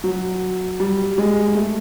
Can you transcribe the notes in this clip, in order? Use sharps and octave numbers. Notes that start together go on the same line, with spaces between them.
F#3
G3
G#3
A3